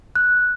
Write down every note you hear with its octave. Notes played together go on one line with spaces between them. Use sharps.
F#6